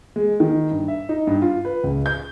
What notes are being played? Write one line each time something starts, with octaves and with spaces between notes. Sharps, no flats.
G#3
D#3
G2
E5
D#4
G2
F4
B4
C#2
G6